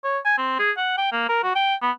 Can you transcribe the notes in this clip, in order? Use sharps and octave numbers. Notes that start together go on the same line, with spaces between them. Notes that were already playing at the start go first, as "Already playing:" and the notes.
C#5
G#5
C4
G#4
F#5
G5
A#3
A#4
F#4
G5
B3